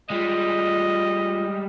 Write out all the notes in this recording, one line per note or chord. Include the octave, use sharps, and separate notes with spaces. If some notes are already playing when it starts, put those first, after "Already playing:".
G3 G#3 F4 D#5